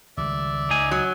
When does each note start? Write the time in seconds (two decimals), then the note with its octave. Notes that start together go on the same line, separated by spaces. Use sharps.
0.17 C#2 D#3 G3 D5 E5
0.70 C#2 D#4 G#5
0.91 F#3